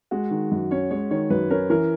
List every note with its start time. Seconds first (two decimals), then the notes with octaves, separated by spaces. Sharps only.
0.11 G#3 F#4
0.31 D#3
0.51 F#2
0.71 C#4 C#5
0.91 G#3 C#5
1.11 D#3 C#5
1.30 F#2 B4
1.50 C#4 A#4
1.70 E3 A#4